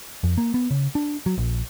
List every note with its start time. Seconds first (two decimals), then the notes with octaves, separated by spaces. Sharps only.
0.24 F2
0.38 A#3
0.54 B3
0.71 C#3
0.95 D4
1.26 F#3
1.38 A#1